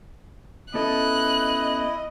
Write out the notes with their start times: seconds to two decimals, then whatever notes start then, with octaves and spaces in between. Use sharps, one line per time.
0.74 B3 C#4 E4 A4 D#5 F#6